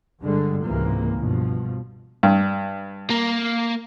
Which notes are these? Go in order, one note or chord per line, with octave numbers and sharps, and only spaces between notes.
G2 D3 G3 G#3
C#2 G#2 C3 E3 F3 A#3
G2 B2 F3
G2
A#3